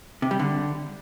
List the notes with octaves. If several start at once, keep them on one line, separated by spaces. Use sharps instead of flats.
C3
G3
D3